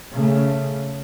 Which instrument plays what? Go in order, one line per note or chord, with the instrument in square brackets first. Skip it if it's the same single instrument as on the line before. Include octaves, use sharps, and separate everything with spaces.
[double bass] C#3 A3